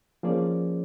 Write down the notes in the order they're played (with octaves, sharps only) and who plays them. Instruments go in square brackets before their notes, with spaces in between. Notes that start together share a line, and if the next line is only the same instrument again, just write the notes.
[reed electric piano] F3 A#3 C#4 G#4 C5 D5